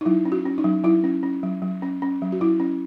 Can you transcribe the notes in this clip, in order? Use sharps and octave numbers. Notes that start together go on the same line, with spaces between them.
D#4
F#3 E4
C#4
F#4
C#4
D#4
F#3
F#3 E4
C#4
C#4
F#3
F#3
C#4
C#4
F#3
F#4
F#3 E4
C#4